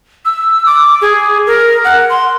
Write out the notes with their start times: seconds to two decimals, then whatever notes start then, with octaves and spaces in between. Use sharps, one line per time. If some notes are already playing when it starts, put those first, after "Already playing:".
0.25 E6
0.66 D6
1.02 G#4
1.47 A#4
1.84 F#5
2.10 C6